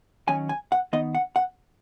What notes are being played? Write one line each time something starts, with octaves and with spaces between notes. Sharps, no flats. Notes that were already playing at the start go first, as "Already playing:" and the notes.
D#3 F#3 C#4 G#5
G#5
F#5
D#3 B3 D#4 D#5
F#5
F#5